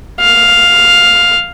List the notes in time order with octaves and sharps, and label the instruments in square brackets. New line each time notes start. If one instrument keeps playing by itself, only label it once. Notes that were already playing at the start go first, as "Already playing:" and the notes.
[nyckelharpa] F5